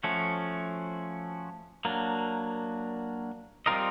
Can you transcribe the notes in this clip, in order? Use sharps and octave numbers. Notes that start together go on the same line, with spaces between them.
F3 A3 C#4 F#4
F#3 A#3 D4
G3 C4 F4 A#4 D#5